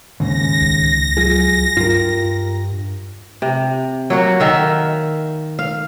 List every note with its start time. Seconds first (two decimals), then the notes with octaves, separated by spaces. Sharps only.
0.20 D#2 G#2 C#3 A#6
0.61 C#2
1.17 F#3 F4 G#4
1.77 G2 F4 G4 A#4
3.42 C3
4.10 F#3 A#3 F#4
4.40 D#3 E5 F5
5.59 F5